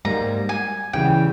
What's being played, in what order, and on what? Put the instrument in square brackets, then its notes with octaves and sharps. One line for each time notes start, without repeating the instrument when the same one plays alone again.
[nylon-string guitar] G#2 G3 A#3 [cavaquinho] A#5
[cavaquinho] G#5
[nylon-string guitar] C#3 E3 G3 [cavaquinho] G5